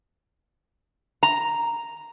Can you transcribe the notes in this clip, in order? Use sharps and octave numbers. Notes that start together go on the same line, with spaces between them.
A#5